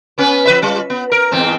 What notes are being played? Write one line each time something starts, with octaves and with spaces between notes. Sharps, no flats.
B3 C#4 B4
F3 B4 E5
G3 F4
B3
A#4
E2 G#2 C4